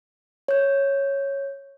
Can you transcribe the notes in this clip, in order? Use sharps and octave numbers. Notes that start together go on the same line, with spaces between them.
C#5 G6